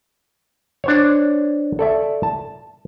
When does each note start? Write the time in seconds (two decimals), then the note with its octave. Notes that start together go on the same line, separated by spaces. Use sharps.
0.84 D4 C5 C#5
1.79 A4 D5 E5
2.23 A5